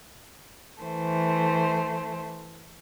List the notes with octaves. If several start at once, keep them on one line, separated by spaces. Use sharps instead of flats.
E3 A3 C5